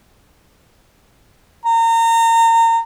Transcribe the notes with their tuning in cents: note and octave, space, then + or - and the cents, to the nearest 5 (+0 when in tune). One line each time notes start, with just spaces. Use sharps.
A#5 -30